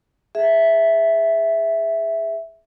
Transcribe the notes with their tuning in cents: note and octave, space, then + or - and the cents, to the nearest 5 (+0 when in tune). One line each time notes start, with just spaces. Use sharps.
G#4 +0 E5 +0